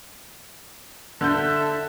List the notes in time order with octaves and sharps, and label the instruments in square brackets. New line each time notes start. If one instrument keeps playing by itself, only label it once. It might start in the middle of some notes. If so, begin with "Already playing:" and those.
[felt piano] D3 F#6 G6 [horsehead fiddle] A4 E5